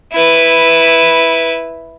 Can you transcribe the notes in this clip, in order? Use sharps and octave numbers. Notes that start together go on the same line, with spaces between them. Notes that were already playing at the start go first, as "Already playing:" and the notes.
E4 B4